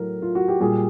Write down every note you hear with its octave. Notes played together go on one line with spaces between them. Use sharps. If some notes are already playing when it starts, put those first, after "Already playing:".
Already playing: A2 F#3 A3 A#4
F4
F#4
G4
A#2 G3 G#4